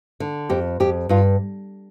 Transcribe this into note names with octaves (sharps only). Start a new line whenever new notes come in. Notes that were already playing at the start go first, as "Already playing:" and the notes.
D3
F2 G4
F2 G4
G2 F4